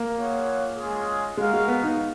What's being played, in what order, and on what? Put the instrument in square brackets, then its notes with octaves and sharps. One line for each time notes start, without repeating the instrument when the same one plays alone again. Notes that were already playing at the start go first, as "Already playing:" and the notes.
Already playing: [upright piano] A#3
[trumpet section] F4 G#4 C#5 F#5
G#3 C#4 F4 G#4
[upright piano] G#3 [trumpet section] F#4 A#4 F5
[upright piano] G#3
B3
D#4